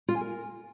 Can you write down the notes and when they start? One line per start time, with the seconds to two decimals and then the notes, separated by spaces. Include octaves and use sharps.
0.08 F4
0.15 G#5
0.21 A#4